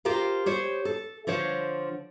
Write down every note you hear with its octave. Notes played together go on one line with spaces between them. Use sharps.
F4 G4 A#4 C5 F5
G4 C5 C#5
A4
D3 F3 C5 C#5